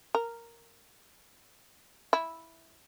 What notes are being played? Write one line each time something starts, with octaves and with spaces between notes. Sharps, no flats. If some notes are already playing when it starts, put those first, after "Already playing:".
A#4
E4